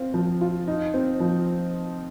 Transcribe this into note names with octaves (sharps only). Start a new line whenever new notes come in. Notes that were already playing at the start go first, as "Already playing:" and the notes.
Already playing: C4 F4
F3
F4
D#4
C4
F3